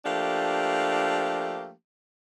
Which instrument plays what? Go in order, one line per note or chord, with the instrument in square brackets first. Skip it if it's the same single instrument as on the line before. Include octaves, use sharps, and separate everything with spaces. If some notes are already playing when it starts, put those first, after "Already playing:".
[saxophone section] F3 A3 A#3 D4 G4